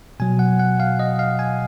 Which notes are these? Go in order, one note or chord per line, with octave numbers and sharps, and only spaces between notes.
B2 F#3 G#5
F#5
F#5
F5
D#5
F5
G#5